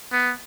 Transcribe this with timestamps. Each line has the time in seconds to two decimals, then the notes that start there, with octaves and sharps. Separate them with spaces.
0.12 B3